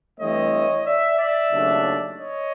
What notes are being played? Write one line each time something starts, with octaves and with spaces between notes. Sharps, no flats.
G2 E3 A3 C4 C#5 D#5
D5 E5
D5 E5
D#2 C#3 F#3 A3 D4
C#5 D#5